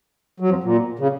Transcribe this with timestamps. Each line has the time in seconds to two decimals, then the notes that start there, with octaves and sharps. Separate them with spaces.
0.40 F#3
0.49 F2 F3
0.64 A#2
0.99 C#3